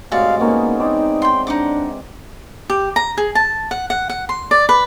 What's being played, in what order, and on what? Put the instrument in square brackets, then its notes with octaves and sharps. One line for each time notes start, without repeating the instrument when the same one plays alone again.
[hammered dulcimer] A2 C3 G#3 [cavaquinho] F#4 D5 [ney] F5
[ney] A#3 [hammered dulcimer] B3 C#4 D#4
[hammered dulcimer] C4 E4 D5 [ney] D#4
[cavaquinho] G5 C6
[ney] D4 [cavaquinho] D#4 F#5 D6
[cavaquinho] G4
A#5
G#4
A5
F#5
F#5
F#5
C6
D5
B4